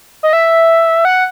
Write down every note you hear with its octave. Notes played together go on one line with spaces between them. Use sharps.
D#5
E5
F#5